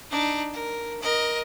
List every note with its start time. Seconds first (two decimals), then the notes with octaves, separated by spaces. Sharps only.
0.11 D4 D#4
0.53 A#4
1.02 A#4 D#5